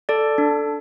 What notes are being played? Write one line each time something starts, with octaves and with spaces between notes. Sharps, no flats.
A4 D5
D4